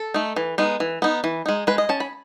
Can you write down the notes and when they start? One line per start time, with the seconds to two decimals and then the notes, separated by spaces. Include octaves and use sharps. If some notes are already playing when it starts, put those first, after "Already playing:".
Already playing: A4
0.14 A3 D#4
0.36 E3
0.58 G#3 B3 D#4
0.80 E3
1.02 B3 D#4
1.24 E3
1.46 G#3 D#4
1.67 G#3 B4
1.78 D#5
1.89 C#4 A5
2.00 B5